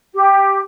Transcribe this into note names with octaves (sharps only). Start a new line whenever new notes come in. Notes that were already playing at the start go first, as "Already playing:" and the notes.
G4